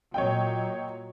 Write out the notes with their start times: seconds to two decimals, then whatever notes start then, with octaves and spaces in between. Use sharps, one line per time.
0.14 A#2 F#3 C#5 D#5 G5